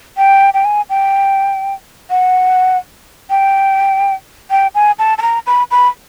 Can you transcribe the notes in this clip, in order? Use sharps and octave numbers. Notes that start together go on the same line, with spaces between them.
G5
G5
G#5
G5
F#5
G5
G5
G#5
A5
A5
A#5
B5
B5